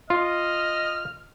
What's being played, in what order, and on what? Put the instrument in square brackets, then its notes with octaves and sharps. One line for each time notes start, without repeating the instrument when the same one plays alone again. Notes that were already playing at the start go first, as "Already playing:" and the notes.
[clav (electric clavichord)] F4 [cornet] D#5 [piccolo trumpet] F6